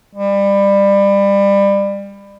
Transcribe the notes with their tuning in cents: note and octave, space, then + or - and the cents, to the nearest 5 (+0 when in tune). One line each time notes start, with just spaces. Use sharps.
G3 +25